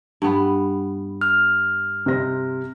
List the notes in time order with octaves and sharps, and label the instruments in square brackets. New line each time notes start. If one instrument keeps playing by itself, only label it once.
[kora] G2 B3
[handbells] F6
[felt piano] C3 C5 A#6